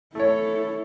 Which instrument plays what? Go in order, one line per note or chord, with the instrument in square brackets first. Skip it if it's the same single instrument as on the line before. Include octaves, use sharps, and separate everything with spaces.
[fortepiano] A3 C#5 [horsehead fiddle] E4 A4